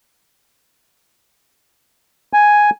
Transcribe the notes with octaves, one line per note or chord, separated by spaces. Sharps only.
G#5